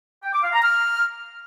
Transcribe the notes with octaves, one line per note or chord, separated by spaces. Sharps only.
G5
D6
F5
A#5
F6